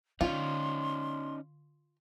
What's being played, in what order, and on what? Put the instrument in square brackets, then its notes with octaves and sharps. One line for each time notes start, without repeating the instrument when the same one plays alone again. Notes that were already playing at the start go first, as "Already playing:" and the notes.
[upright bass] D3 [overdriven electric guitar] C#4 D#4 [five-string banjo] F4 [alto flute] C6